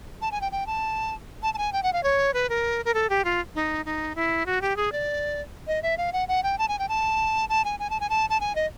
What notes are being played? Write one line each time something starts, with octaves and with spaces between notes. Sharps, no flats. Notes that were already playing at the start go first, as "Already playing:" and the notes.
A5
G#5
G5
G5
A5
A5
A5
G#5
G5
F#5
F5
C#5
B4
A#4
A#4
A4
G4
F4
D#4
D#4
E4
F#4
G4
G#4
D5
D#5
E5
F5
F#5
F#5
G5
A5
G#5
G5
A5
A5
G#5
G#5
A5
G#5
A5
A5
G#5
D#5